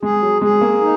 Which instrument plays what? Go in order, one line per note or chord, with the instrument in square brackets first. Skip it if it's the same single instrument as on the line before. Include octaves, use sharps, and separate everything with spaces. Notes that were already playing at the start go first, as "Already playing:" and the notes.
[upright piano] G#3 [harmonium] G#4
[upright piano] F#3
[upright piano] G#3 [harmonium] G#4
[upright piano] A#3
[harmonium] D#4